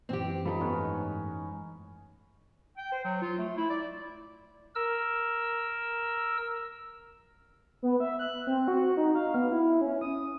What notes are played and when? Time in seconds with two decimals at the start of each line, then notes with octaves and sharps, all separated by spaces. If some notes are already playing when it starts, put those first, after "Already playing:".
0.09 F#2 E3 C4 G4
0.45 G3 D#4 F4 A4 B5
0.60 G#2 A3 B3 C#4
2.77 G5
2.92 C5
3.05 F#3
3.22 F4
3.38 A3
3.57 E4
3.70 D5
4.75 A#4 E6
7.82 B3
8.00 E5
8.19 F#6
8.47 C4
8.68 F#4
8.97 D#4
9.15 F5
9.34 B3
9.51 E4
9.81 C#4
10.01 D#6